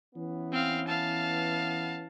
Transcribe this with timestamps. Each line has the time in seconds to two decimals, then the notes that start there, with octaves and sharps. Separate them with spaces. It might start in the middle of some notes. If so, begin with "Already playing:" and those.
0.15 E3 B3 C#4
0.52 C4 F5
0.88 F5 A5